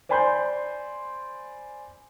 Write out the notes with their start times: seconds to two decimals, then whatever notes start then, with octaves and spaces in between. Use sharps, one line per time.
0.09 C5 D5 G#5 B5 C6 G6